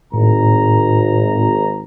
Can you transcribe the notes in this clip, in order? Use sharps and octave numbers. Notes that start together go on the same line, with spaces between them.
G#1 A2 A#5